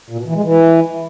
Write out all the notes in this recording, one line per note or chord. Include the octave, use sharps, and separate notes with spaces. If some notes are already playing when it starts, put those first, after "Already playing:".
A#2
B2
E3
G#3
E3